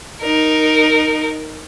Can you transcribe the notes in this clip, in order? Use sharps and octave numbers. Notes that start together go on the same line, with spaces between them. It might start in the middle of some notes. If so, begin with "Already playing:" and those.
D#4 A#4